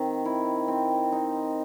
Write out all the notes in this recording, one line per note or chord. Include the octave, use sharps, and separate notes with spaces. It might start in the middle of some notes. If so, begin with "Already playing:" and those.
Already playing: D#3 C4
E4
C4
D#4